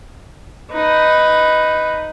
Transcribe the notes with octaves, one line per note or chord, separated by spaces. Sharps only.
D#4 B4